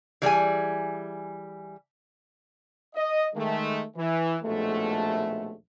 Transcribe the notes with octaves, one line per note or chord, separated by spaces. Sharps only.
E3 G3 G#4 G#5
D#5
D#3 G#3 A3
E3
A#1 D#2 B2 G#3 A3